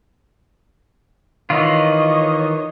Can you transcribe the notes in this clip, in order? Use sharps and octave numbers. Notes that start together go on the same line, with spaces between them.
D#3 E3 F4 C#5 D#5